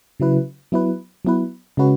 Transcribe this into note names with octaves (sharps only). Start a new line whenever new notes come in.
C#3 F#3 E4 B4
F#3 B3 E4 B4
F#3 B3 E4 B4
C#3 G#3 C#4 F#4 B4